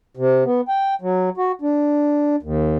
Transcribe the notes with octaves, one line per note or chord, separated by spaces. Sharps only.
C3
B3
G5
F#3
F#4
D4
D#2